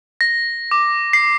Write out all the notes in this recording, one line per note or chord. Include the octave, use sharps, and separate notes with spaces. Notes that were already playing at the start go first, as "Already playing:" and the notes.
A#6
D6
C7